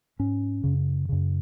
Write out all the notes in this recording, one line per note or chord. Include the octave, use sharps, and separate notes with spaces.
G#2 C#4
F#2 C#3
F#2 C#3